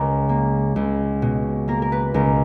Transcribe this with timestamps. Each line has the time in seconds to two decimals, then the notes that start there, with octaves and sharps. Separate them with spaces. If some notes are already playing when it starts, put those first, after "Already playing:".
Already playing: C#2 A#4
0.29 A#3
0.76 C#2
1.22 B2
1.68 A#3 A#4
1.82 A#4
1.92 B4
2.14 C#2 A#4